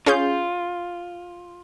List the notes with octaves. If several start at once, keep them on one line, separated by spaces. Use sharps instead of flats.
C#4 F4 G#4 G6